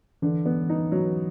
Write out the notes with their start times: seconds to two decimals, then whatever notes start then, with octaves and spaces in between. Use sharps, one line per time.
0.22 D3 E3
0.46 B3
0.69 D#4
0.92 F#3